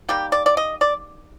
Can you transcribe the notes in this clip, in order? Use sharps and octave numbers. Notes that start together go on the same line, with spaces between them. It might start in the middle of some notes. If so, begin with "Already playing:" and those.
D#3 G3 A#3 G4
D5
D5
D#5
D5